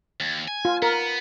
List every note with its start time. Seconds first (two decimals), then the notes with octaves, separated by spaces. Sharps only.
0.20 D#2
0.48 G#5
0.65 F4
0.82 B3 A#4